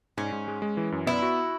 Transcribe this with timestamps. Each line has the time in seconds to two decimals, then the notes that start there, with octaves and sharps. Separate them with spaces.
0.17 G#2 C#4
0.32 G#2
0.48 G#3
0.62 G#3
0.77 E3
0.92 F#2
1.07 B3 E4
1.22 F#4